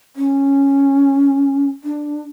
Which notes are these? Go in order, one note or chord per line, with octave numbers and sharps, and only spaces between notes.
C#4
D4